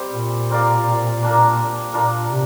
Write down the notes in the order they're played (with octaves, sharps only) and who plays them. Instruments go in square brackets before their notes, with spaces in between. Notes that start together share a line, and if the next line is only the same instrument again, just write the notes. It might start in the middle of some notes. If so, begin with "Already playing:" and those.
Already playing: [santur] G3 C4 G4 C5
[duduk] A#2
[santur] C4 A#4 D5 F5
A#3 D4 A#4
[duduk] A#2 [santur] D4 F4 A#4
[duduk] C3